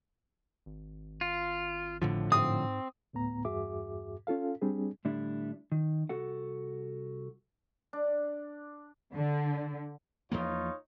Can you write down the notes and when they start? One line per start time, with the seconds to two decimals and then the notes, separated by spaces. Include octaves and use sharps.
0.66 G#1
1.21 F4
2.02 A2 D3 F3
2.32 G#2 C4 D#6
3.13 D2 A2 B3 A#5
3.45 E2 G2 F#4 G#4 E5 D6
4.27 C#4 F4 A4 F5
4.62 G3 C4 D4 G#4
5.05 A2 D3 G3 D4 E4
5.72 D#3
6.09 C2 F#4 A4 F#5
7.93 D4
9.14 D3
10.32 E2 F3 A#3 D#4 F4 C#5